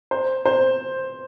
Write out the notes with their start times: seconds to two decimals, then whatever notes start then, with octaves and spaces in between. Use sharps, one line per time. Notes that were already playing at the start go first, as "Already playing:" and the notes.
0.11 C5
0.46 C5